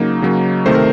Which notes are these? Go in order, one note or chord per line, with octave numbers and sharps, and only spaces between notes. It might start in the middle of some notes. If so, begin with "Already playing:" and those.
Already playing: C#3 F#3 A#3 D#4
C#3 F#3 A#3
C3 D#3 A3 C5
A#4